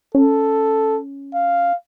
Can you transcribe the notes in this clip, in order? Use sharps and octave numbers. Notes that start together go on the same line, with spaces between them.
C#4 A4
F5